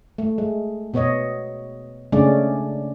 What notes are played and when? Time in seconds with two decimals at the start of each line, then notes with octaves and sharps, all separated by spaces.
0.18 A3
0.38 G#3
0.94 B2 B3 C#5 D#5
2.12 C#3 G#3 A3 C#4 D4 D5